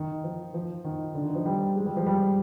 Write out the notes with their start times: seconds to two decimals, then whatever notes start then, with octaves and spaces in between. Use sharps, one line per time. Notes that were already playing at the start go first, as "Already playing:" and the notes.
Already playing: D#3
0.24 F3
0.54 F3
0.84 D#3
1.15 D3
1.25 D#3
1.35 F3
1.46 G3
1.76 G#3
1.86 G3
1.96 F3
2.06 G3